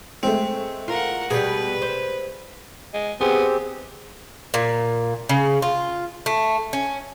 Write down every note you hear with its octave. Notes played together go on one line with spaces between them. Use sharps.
G#3 A3 C4
F4 A#4 F#5
B2 G3 G#4 B4
C5
G#3
B3 C4 G4 G#4 C5
A#2
C#3
F4
A3
C#4